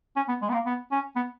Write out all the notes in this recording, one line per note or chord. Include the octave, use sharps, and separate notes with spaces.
C#4
B3
G#3
B3
A#3
B3
C#4
B3